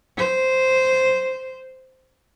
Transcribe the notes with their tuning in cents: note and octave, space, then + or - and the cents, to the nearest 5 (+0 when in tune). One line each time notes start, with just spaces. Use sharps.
C5 -5